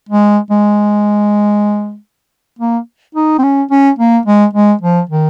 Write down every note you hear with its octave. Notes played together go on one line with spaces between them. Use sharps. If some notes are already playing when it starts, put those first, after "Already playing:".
G#3
G#3
A#3
D#4
C4
C#4
C#4
A#3
G#3
G#3
F3
D#3